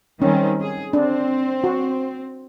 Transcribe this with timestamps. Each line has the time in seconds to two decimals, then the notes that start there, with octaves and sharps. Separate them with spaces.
0.22 D#3 G3 C4 C#4
0.61 G#4
0.93 C4 D4
1.64 F#4